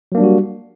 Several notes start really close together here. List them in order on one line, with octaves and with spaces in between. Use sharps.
F#3 A#3 D4 G3 F#4